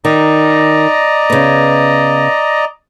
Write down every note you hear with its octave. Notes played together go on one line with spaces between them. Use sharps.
D#3 D5 D#5 A#5
C#3 B3